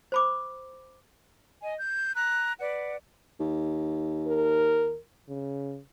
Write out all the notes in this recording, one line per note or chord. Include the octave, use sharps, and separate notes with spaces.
C5 B5 D6
D#5 G#5
G6
A#5 F#6
B4 D5 F#5
D#2
A#4
C#3